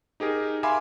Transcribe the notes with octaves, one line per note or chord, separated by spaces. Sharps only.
D#4 G4 G#4 A#4
E5 F5 G#5 B5 C6 D6